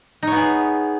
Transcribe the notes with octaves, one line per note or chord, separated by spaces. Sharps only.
B3 D#4 G#4 C#5